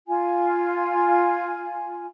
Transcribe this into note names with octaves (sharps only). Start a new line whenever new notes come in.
F4 G#5